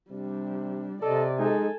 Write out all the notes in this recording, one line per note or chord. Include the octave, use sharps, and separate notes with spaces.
C3 G3 D4
C3 A4 D5 D#5
G#3 D#4 A4 G#5